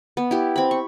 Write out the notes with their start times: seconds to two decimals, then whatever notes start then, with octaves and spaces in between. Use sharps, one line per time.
0.17 B3
0.31 E4 G4
0.56 C4 B5
0.71 C#6